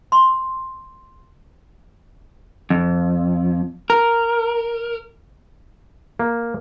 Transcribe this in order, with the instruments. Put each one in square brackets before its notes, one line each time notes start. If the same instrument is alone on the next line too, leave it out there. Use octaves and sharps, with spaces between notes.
[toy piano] C6
[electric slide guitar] F2
A#4
[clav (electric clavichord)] A#3